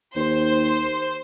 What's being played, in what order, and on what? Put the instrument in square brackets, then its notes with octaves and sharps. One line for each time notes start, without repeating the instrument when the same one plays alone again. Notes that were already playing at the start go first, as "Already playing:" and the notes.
[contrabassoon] D#2 [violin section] C5